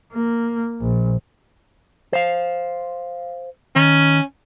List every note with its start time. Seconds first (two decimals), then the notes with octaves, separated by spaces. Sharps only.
0.13 A#3
0.81 A#1
2.13 C5 F5
3.76 D#3 C#4